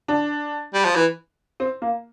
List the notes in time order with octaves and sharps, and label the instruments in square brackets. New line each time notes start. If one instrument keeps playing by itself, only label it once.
[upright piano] D4
[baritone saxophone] G3
F3
E3
[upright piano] C4
A#3